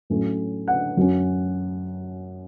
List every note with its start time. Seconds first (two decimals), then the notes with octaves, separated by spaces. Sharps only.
0.10 A2 F#3 A3 C#4
0.68 F#5
0.97 F#2 F#3 C#4